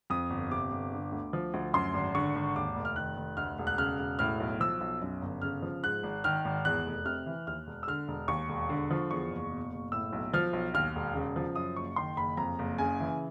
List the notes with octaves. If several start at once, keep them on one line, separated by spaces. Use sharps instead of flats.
F2 D#6
G1
C3 D6
G1
D3
D2
F3
D2
F#2 C6
G#1
D3 C#6
G#1
D#2 D6
F1
F6
D#3 F#6
F1
D2 F6
E1
F#6
C#3 F6
E1
A2 F6
B1
F3 E6
B1
F#2
G1
C#3 F6
F3
G#2 F#6
G#1
D#3 F6
G#1
E2 F#6
F1
C3 F6
E3
D#2 F6
E1
E6
D3 F6
E1
D#2 C#6
E1
D3
F3
E2 C#6
F#1
B2
F#1
A2 E6
B1
F3 F6
B1
D#2 F6
E1
C#3
F3
F#2 D#6
F#1 C#6
D#3 C6
F#1 B5
F2 A#5
F#1
C#3 G#5
E3